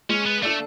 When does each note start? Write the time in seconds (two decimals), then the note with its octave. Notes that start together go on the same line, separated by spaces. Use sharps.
0.09 G#3 C#4
0.26 B3
0.43 A3 D4 A4 D5